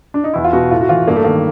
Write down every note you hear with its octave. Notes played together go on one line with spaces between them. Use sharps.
D4
D#4
E2 E4
F4
B2 F#4
A2 F4
F#4
E3 F4
G2 A#3
A3
D#3 A#3